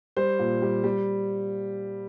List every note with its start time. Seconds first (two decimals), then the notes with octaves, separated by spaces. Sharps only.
0.17 G3 C5
0.39 A#2
0.62 G3
0.84 G3